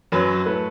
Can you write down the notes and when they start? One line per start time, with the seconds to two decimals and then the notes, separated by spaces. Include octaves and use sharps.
0.12 F#2 F#3 C#4 B4
0.46 A2 A3 B4